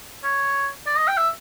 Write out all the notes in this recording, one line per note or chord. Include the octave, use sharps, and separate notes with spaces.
C#5
D5
D#5
G5
E5